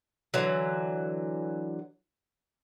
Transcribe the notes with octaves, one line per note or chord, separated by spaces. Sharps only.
D3 E3 F#3